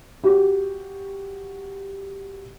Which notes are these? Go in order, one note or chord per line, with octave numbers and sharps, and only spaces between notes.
F#4 G4